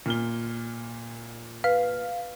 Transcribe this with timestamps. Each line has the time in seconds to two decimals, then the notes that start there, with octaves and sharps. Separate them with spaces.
0.06 A#2 F6 G7
1.64 B4 F5